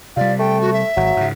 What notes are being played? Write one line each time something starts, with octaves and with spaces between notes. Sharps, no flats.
C3 G3 F4 D5
A3 G5
F#4
E5
G#1 F#3
G#2 C#3